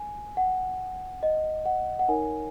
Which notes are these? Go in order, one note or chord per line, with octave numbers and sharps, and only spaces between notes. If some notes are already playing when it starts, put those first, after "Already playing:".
Already playing: G#5
F#5
D#5
F#5
F#5
D#4 A#4 C#5 G#5